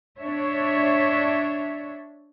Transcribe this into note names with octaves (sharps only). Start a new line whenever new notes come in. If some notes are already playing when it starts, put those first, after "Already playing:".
D4 C#5 E5